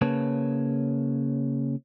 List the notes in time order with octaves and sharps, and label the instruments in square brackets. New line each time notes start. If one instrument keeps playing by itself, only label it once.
[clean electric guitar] C#3 A#3 B4 C#5 A5